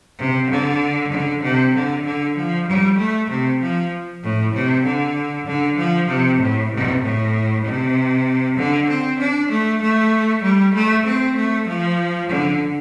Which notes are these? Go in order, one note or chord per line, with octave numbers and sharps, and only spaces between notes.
C3
D3
D3
C3
D3
D3
F3
G3
A3
C3
F3
A2
C3
D3
D3
F3
C3
A2
C3
A2
C3
D3
C4
D4
A3
A3
G3
A3
C4
A3
F3
D3